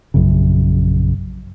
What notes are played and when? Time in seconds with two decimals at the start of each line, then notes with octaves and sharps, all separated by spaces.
0.14 A#1 F#2 C#3